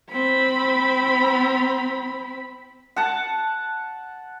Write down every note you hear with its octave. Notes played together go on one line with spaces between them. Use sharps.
C4 B5
F#5 A5